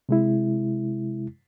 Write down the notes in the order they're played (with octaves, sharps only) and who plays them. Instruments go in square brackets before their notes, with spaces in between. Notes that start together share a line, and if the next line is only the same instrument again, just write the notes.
[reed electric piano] C3 G#3 E4